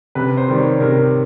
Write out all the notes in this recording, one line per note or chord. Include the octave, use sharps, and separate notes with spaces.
C3 B4
C5
D#3 G3
C#5
C3 A#4